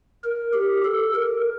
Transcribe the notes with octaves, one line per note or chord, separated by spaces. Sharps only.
A#4
G4
A4
A#4